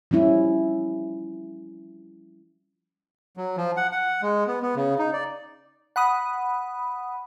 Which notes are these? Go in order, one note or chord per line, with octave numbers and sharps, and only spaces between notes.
F3 G3 C#4 E4
F#3
F3
F#5
F#5
G#3
B3
B3
C#3
D#4
D5
F#5 B5 D#6